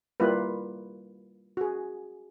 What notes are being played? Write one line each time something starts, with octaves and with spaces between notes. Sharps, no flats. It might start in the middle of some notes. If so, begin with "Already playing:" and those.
G3 A#3 E4 F4 B4
F#4 G#4